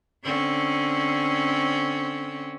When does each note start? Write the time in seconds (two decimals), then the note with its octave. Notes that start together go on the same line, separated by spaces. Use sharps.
0.24 D3 C4 C#4